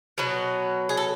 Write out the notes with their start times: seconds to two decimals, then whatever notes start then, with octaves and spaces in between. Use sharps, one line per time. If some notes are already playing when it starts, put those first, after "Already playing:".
0.18 B2 F#3 B3
0.89 G#4
0.97 A4